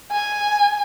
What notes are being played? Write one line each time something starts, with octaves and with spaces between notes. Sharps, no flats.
G#5